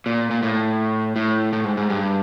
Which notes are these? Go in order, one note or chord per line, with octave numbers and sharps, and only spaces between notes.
A#2
A#2
A2
A2
A2
G#2
G#2
G2